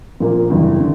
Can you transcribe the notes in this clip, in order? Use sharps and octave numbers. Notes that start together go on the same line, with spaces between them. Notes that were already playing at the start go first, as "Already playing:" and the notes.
A#1 A#2 A#3
F#1 E2 D3 G3
D3